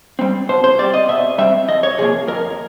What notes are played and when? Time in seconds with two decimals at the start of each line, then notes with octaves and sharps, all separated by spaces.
0.19 G3 C4
0.49 B2 C5
0.64 C5
0.79 G3 C4 D5
0.94 D#5
1.09 B2 E5
1.38 G3 C4 E5
1.68 F2 D#5
1.83 C#5
1.98 C3 F3 A#3 G#4
2.28 F2 A#4